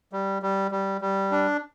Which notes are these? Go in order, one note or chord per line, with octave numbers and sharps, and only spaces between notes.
G3
G3
G3
G3
D4